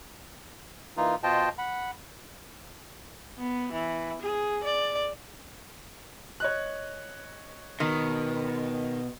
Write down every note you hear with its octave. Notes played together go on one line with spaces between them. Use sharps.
E3 A#3 D#4 F4
B2 F4 C5 D#5 G5 A5
F#5 B5
B3
E3
G#4
D5
C#5 D#5 F#6
B2 D#3